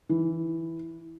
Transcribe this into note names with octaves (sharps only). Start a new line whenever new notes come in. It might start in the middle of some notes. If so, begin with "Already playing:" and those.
E3